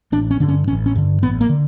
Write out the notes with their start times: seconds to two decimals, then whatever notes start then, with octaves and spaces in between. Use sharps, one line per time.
0.12 A1 D4
0.31 C#4
0.40 G2 D3 D4
0.48 C#4
0.68 A1 C#4
0.86 C#4
0.95 G2 D3
1.22 A1 B3
1.41 A#3
1.49 D3